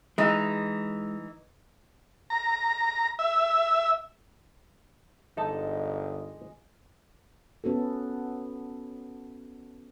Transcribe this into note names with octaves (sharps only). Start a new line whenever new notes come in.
E3 G#3 D#4
A#5
E5
G1 G#3 D#4 A4 D#5 A5 D6
B3 C#4 F#4 A4